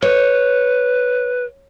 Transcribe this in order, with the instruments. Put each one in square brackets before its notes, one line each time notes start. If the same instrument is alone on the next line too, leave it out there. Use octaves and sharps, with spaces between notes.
[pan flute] B4 [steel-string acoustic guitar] C#5